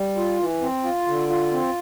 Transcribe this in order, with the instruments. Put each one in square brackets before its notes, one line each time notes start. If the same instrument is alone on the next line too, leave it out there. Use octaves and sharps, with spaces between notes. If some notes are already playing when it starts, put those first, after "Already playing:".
Already playing: [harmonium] G3
F4
E3
C4
F4
D3
F4
C4